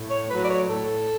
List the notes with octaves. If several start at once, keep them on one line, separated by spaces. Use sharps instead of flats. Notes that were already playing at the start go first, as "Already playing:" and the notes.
Already playing: A2
C#5
F#3 A3 B4
D5
C#5
A2 A4